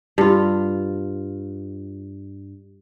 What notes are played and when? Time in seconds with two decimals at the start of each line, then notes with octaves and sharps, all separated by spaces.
0.18 G2 F4